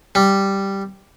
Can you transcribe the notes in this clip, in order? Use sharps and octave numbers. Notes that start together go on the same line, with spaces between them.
G3